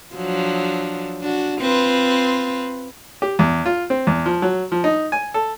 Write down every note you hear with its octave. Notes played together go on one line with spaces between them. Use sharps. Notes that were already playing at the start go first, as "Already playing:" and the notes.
F3 F#3 D4
D4 F#4
C4 F4 B4
G4
E2
F4
C4
E2
F3
F#3
F3
D#4
G#5
A4